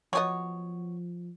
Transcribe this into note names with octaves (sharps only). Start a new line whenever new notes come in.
F3 F#3 B3 G4 C#5 D#5